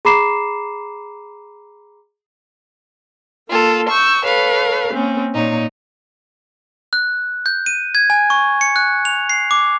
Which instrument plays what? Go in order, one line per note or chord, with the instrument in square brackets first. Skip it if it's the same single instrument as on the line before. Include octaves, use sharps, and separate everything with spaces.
[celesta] G#4 A#5 B5 D6 C7 E7
[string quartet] A#3 F4 A4
C#6 E6 G6
A4 B4 C#5 F5
A#3 C4 C#4
A#2 D#4 C#5
[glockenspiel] F#6
G6
D#7
G#6
G#5
C#6
C#7
F#6
F7
C7
D6